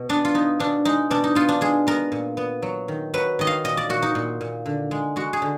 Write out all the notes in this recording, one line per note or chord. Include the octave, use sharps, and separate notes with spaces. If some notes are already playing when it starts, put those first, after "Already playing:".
Already playing: B2
B3 D4
F4
B3 D#4
B2 D4
G#3 D#4
B2 D4
D#4
B3 F4
D4
G#3 G#4
B3 A#4
A#2
B3
F#3
D#3
F#3 B4
D#3 D#5
F5
A#2 D#5
D5
A#2 F#4
D#4
A#2
A#2
D3
G#3
G#3 F#4
G#4
D3